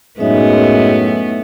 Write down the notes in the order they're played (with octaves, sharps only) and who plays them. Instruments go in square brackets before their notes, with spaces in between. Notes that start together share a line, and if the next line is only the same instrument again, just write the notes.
[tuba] F#2 [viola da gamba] A2 B3 [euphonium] G#3 [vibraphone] D#4 C#5 E5